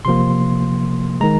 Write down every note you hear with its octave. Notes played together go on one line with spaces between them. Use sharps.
C3 F3 A#3 C6
D#3 G#3 A#5